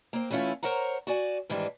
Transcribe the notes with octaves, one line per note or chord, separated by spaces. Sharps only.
A#3 C4
E3 A3 C#4 E4 F4
A#4 C5 C#5 F#5 A#5
F#4 D5 G#5
G#2 D#3 E3 G3 D4